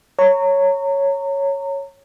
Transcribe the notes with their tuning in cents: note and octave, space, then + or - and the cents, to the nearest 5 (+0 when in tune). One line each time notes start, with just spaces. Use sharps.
C#5 +0 A#5 -25